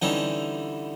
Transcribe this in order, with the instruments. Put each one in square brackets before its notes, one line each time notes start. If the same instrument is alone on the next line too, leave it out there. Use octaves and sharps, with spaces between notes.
[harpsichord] D3 E3 G3 C#4 D#4